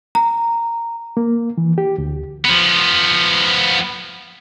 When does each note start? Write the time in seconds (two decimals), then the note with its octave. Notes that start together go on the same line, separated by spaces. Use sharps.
0.15 A#5
1.17 A#3
1.58 E3
1.78 G4
1.98 D2
2.45 F3 B3